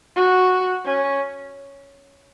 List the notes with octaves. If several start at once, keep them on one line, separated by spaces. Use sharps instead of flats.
F#4
C#4